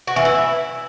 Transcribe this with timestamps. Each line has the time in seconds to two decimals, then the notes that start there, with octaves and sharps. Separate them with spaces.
0.07 F#4
0.16 E3
0.25 E4